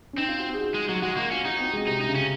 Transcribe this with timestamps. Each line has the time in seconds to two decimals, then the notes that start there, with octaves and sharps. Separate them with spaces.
0.13 C#4
0.17 C4 D#4
0.28 F4
0.39 F#4
0.53 G#4
0.60 F#4
0.74 G#3
0.89 F#3 F#4
1.02 G#3 F#4
1.17 A#3 F4
1.31 C#4 F4
1.45 D#4 F#4
1.59 C4
1.73 G#3
1.87 C3 D#4
2.01 D#4
2.08 C#3
2.15 C#4